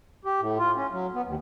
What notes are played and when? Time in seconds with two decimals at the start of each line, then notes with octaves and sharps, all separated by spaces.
0.25 G4
0.41 A2
0.58 F4
0.76 C#4
0.92 F#3
1.14 B3
1.26 D#2